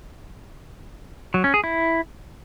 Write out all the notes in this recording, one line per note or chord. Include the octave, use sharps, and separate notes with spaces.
F#3
C#4
G#4
E4